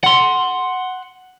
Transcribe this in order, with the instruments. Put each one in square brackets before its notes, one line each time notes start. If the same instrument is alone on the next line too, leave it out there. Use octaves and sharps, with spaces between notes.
[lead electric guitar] F#5 C6